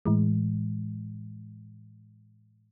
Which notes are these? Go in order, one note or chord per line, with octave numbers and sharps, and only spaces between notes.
A2 E3 G#3